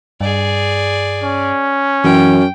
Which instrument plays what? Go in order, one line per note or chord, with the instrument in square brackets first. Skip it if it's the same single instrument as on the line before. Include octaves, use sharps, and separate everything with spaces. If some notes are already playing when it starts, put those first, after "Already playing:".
[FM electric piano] G2 [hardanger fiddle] G#4 D5
[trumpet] C#4
[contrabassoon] F#2 [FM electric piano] E3 [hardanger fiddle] G5